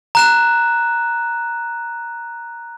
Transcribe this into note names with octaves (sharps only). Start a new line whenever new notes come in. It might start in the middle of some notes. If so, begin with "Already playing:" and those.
A#5 F#6 E7